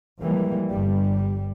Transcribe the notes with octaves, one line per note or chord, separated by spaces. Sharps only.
E3 F3 G3 G#3 A#3
G1 G3